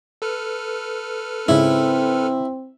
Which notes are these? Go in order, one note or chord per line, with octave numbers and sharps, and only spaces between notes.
A4 B4 F6
G#2 C#3 C4 E4